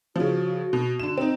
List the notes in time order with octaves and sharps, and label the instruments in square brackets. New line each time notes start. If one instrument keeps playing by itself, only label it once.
[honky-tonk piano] C#3 F3 [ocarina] F#4
[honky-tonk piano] B2
D3 E7
C4 D#4